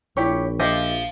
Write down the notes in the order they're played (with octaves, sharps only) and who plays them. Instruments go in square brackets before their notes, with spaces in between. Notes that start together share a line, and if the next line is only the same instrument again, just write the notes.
[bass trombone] A#1 [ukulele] E4 G4 C#5
[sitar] F3 [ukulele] G4 D#5 E5